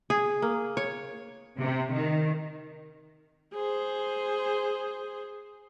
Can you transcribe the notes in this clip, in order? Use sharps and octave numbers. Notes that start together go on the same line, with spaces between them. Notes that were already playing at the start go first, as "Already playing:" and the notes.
G#4
A#3
C#5
C3
D#3
G#4 C5